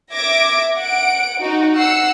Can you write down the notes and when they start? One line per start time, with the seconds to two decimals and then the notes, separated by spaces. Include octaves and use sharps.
0.14 E5 D6 G#6 A#6 D7
0.76 F#5 D7
1.38 D#4 F#4
1.77 F#5 E6 C7 C#7